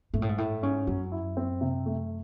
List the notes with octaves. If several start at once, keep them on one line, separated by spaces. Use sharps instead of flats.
G#2 A3
A2
G#2
A2 E4
G#2 C#4
F#2 F#3
E4
C4
C3
A3